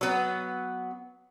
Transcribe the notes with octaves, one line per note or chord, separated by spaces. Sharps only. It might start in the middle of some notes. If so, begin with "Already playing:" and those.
F#3 B3